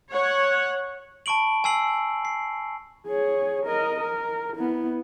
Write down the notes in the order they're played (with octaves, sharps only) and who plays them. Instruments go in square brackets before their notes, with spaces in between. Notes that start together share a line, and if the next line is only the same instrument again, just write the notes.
[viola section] C#5 F#5
[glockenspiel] A5 B5 C#6 D7 F#7
G#5 A5 E6 C7 F#7
C7
[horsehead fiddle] G#4 C#5
A#4 D#5
A#4
B3 E4